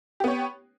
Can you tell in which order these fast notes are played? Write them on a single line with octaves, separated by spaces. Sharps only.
G4 B3 C#5